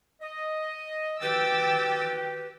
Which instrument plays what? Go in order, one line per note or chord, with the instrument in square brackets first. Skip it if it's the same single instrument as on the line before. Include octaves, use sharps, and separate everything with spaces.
[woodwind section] D#5
[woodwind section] D#3 F#4 G4 [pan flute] B4 [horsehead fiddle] G5 [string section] D6 E6 A6